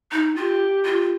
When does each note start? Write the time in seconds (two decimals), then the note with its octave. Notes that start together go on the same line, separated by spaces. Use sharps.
0.12 D#4
0.36 F4 G4
0.85 F4